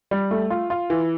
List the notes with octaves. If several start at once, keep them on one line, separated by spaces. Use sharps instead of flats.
G3
A3
F4
F4
E3